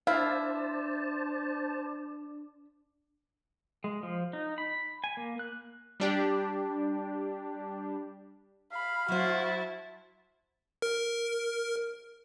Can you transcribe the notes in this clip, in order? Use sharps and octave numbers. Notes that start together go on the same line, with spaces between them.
D4 E4 C5 F5 A5
G#3
F3
D#4
B5
G#5
A#3
F#6
G3 D4 G4
F5 B5
F#3 E4 F#4 C5 A5
A#4